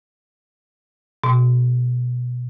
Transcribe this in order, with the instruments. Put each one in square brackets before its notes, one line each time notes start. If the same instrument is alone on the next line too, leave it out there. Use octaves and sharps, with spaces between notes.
[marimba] B2